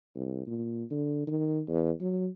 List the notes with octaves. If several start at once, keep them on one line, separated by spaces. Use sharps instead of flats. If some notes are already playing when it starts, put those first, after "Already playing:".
C2
A#2
D3
D#3
E2
F#3